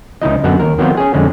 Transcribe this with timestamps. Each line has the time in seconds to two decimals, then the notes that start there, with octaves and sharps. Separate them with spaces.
0.22 C#2 D#4 E4 D#5
0.44 F#2 D3 B3 F#4 F#5
0.60 D#2 A#4
0.78 D#3 F#3 B3 C4 F4
0.97 C#4 G#4
1.14 F2 D3 G#3 C#4